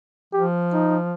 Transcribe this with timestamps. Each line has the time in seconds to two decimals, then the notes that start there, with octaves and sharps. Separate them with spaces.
0.33 F3 G4
0.73 D#4